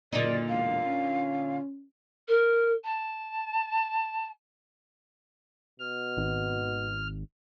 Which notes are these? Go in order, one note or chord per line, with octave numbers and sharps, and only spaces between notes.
F#1 A#2 D3 D#4 D5
E1 F5
C#4
A#4
A5
B2 F6
G#1